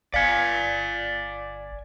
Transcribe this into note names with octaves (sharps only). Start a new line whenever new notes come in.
G1 D5 F5 G#5 B6 C#7